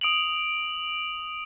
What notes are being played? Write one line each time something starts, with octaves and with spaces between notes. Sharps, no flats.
D#6 D7 F7 F#7